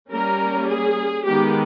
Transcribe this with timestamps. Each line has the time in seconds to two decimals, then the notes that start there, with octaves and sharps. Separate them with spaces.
0.10 G3 A#3 C#4 A#4
0.68 G#4
1.25 D#3 G#3 B3 G4